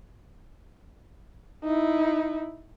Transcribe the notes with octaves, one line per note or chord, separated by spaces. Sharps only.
D#4 E4